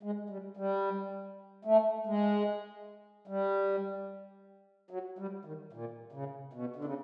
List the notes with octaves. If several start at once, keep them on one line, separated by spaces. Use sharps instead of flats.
G#3
G3
G3
A3
G#3
G3
F#3
G3
D#3
A#2
C#3
B2
D3
C#3